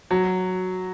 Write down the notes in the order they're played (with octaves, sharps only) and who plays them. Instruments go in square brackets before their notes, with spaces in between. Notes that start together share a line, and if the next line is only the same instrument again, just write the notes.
[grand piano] F#3